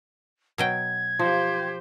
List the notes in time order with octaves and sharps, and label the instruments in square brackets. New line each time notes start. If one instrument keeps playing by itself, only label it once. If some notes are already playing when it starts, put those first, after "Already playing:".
[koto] B2 F#3 G5 [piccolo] G#6
[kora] F3 [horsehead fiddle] G4 C5